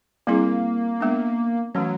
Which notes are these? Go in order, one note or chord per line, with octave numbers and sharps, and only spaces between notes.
G3 A#3 C4 E4 G#4
G#3 B3 D4
E3 F#3 A3 C#4